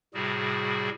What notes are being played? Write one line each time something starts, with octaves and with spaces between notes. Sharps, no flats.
A2 C3 G3 F#4 G#4